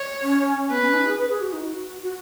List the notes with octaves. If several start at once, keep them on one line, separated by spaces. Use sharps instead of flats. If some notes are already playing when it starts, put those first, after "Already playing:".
Already playing: C#5
C#4
B3 B4
C#4
D#4
G#4
B4
G#4
F#4
D#4
F#4
F#4